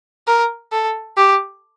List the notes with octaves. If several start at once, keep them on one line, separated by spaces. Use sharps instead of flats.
A#4
A4
G4